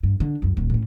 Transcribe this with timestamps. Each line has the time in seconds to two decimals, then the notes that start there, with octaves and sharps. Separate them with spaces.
0.03 G2
0.20 D3
0.42 C#2 F#2
0.57 D#1 D2
0.70 A2 C#4